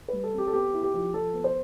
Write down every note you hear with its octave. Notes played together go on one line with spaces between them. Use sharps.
G3 B4
A4
C4
G4
A4
B3 G4
E4
G4
F3
F3 A4
B3
C5